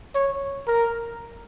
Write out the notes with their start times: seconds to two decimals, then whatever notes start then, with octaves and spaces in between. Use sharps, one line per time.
0.15 C#5
0.67 A#4